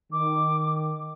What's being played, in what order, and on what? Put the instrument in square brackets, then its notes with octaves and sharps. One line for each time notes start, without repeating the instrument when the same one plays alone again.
[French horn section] D#3 [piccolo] D6